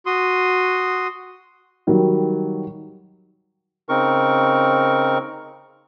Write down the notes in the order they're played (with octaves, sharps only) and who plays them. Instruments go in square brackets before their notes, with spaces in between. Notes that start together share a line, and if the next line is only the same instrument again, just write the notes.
[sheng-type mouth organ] F#4 C6 D#6
[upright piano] D#3 F#3 G3
[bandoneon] C#3 C4 D#4 A#4 C#6